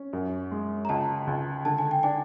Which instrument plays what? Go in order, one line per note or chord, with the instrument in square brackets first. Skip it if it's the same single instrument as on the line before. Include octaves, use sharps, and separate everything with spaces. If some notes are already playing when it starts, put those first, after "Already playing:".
Already playing: [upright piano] C#4
F#2
G#3
[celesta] A#5
[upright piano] C#2 [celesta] A5
[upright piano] C#2
[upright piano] D3 [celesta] A5
[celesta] G#5
G5
[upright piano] D4 [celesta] G#5